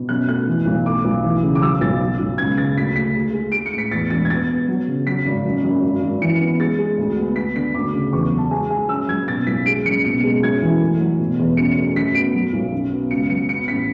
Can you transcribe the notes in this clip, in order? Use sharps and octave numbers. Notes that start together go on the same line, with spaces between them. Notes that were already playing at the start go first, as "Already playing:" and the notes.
Already playing: B2
F#2 F#6
A3 F#6
E3
B1
A3 D6
B1
E3
C#3
D6
F#3 E6
B1 A6
F#3
B1
C#2 G#6
C#3 A6
D2 B6
A3 B6
G#3
G#3
G#3 D7
C#7
A2
B6
E2 A6
E1 A6
G#6
B3 A6
B3
F#3
C#3
F#3 B6
G#1
F#1
F#2
G#1
G#1
E3 C#7
B3
G#3 A6
G#3
D2
B3
B3 B6
D3 B6
D2 D6
C#3
E2 C#6
F#3
A5
G#3 G#5
G#3 G#5
F#2 E6
F#1 G#6
B2 A6
B1 B6
G#3 D7
F#1 C#7
B2 C#7
G#3
F#2 G#6
E3
A3
F#3
B2
E2
F#2 C#7
A3
F#2 B6
B3 D7
F#3
B1
F#2
B3
C#2 C#7
F#3 C#7
B3 C#7
A1 B6